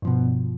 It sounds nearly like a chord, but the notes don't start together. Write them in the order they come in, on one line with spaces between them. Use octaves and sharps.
G2 F3 B2